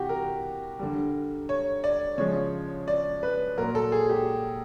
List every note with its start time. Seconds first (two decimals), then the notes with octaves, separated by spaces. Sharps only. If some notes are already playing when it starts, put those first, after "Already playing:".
Already playing: C3 E3 G3 F#4 G4
0.09 A#4
0.79 D3 G3
1.49 C#5
1.84 D5
2.18 C#3 F3 G#3 C#5
2.88 D5
3.23 B4
3.57 A#2 F#3 A#4
3.75 A4
3.92 G#4
4.09 G4